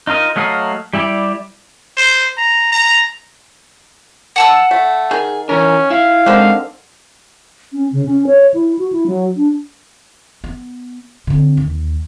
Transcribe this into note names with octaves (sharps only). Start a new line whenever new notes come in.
D#4 F4 A#4 D#5
F#3 A3 D#5 F5 A#5
G3 E4 G4 D5
C5
A#5
A#5
F#5 A5 E6
A3
D#3 G#4
E3 C#4 A#4
E4 F5
D3 D#3 G#3 C4
C#4
C#3
C#4
C#5
E4
F#4
E4
F#3
D4
B3
D3 C4
D#2